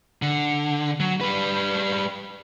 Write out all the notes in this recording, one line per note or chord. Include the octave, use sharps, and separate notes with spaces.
D3
F#3
G3 B4